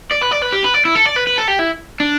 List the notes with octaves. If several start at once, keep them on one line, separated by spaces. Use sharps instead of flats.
D5
B4
D5
B4
G4
B4
D5
E4
A4
D5
B4
B4
A4
G4
E4
D4